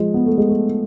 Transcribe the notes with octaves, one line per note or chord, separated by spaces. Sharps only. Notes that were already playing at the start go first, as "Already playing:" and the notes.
Already playing: F3 G#3
B3
A3
G#3
A3